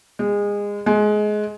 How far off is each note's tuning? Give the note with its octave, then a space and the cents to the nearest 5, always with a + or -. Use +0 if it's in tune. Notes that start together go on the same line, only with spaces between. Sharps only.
G#3 -25
G#3 +20